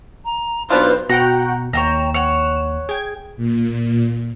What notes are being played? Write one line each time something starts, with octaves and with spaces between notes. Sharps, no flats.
A#5
B1 B3 D4 F4 B4 C5 F#6
B2 F#4 F#5 G5 A#5
D#2 C#5 G5 A#5 E7
C#5 F#5
G#4 G5 G#6
A#2